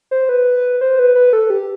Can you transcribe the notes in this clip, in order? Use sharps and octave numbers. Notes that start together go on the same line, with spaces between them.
C5
B4
C5
B4
B4
A4
G4